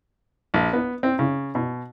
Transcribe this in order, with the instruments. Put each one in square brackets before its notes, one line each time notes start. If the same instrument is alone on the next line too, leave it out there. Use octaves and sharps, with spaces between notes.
[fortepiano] A#1
B3
C4
C#3
B2